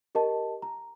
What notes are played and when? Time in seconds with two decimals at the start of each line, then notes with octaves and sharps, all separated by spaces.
0.15 G4 A#4 D#5 A5
0.62 A#5